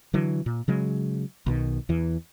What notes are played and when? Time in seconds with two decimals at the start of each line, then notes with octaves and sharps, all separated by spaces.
0.14 D3 E3 F#3
0.46 A#2
0.68 C#3 F#3 G#3
1.46 B1 B2 D#3
1.89 E2 E3